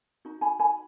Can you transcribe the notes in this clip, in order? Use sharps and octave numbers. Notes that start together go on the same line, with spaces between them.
D#4 F#4
G#5 B5
G#5 B5